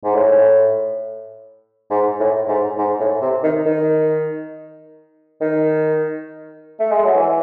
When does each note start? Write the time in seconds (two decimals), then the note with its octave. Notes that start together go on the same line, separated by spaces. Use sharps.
0.04 G#2
0.15 A2
1.90 G#2
2.20 A2
2.48 G#2
2.78 G#2
3.00 A2
3.22 C3
3.43 D#3
3.66 D#3
5.41 D#3
6.80 A3
6.92 G#3
7.04 F#3
7.16 E3